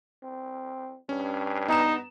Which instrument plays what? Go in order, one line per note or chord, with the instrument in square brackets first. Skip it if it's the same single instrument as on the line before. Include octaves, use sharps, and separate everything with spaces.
[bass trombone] C4
[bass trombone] G2 [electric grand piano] C#4
[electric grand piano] B3 A#5 E7 [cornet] D#4